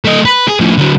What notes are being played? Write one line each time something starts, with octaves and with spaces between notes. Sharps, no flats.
A3 D#5
B4
G#4
A2 F3
D3 F#3